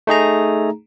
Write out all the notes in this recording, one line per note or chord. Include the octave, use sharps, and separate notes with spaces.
A3 D#4 G#4 A#5